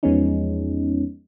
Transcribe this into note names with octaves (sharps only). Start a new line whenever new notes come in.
E2 F3 G#3 B3 C#4 D#4